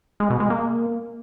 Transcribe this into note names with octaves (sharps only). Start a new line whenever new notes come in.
G#3
B2
G#3
A#3